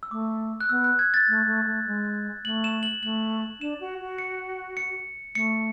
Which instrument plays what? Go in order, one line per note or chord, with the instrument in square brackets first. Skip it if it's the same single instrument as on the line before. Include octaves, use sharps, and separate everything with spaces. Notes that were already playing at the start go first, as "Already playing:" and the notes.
[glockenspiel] E6
[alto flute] A3 [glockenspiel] D6
[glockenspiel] F#6
[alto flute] B3 [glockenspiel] E6
[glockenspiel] F#6
G#6
A6
[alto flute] A3
A3
A3
G#3
[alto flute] A3 [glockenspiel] F#7
[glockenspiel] E7
F#7
[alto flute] A3 [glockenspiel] F#7
[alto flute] D4 [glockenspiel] E7
[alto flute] F#4
F#4
[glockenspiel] C#7
C#7
[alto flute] A3 [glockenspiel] C#7